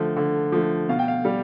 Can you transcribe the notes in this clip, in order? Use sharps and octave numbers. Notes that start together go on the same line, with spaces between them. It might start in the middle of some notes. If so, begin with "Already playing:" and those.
Already playing: D3 F3 A3
D3
F3 A3
B2 F5
G5
F5
G3